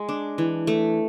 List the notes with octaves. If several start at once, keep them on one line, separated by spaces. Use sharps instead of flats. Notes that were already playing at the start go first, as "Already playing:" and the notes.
Already playing: G#3
D4
E3
A3